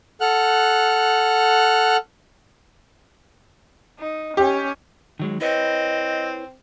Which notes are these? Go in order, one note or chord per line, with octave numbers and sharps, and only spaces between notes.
A4 F#5 F6 F#6
D#4
C#4 G4
D#3 F#3 G#3
C4 E4 B4 C#5 D#5